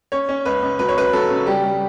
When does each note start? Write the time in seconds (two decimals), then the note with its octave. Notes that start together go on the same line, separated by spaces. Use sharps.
0.12 C#4 C#5
0.29 C#4
0.45 C#2 B4
0.62 C#2
0.79 F#3 B4
0.89 C#5
0.96 C#2 B4
1.13 F#3 A4
1.30 C#3
1.47 G3 G4
1.63 G3